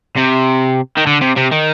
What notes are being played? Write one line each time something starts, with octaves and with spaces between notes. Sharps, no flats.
C3
D#3
D3
C3
C3
D#3